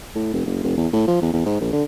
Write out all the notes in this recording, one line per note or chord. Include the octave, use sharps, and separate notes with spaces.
A2
F1
F#1
F1
E2
A2
F3
E2
E2
G#2
A#1
D3